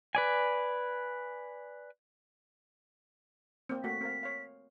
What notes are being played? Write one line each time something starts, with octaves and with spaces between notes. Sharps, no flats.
B4 D5 G#5
A#3 C4
A3 A#3 F#4 B6
C4 A#4 F5
C#5 F5